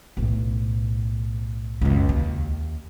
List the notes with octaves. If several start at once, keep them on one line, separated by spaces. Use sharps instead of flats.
B1 A2
C#2 F#2
D#2